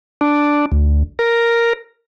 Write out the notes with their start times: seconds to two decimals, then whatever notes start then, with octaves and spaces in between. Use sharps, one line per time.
0.21 D4
0.72 D2
1.19 A#4